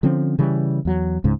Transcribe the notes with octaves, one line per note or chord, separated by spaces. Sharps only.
D3 F3 C4 C#4
C#3 E3 G3
E2 F#3
C#2 G#2 C#3